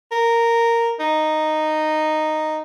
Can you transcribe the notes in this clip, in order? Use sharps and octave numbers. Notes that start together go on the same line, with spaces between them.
A#4
D#4